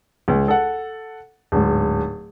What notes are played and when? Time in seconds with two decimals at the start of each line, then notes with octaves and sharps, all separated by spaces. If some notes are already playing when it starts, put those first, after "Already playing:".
0.28 C#2
0.48 A4 F#5
1.52 D1 G#2